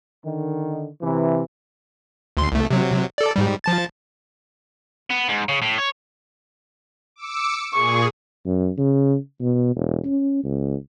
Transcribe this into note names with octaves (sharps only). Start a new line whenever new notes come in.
D3 D#3
C3 E3
D2 C6
C2 A3
C3 F#3
A4 D5
G#2 G3
F3 A5 A6
B3
G#2
C#3
A2
C#5
D6 E6 C#7
A#2 G#4 C#6
F#2
C#3
B2
E1
C#4
C#2